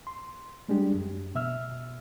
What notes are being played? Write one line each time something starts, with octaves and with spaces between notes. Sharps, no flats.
C6
G3 G#3 D4 G4
F#2
B2 E5 E6 F6